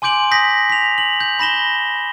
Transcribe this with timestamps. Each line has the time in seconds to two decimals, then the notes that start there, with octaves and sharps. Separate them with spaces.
0.02 G#5 C6 D6 G6 D7 F#7
0.31 D#6 G6 A#6 B6
0.70 B6 F7
0.98 F#7
1.20 G6
1.39 B5 A#6 E7 G7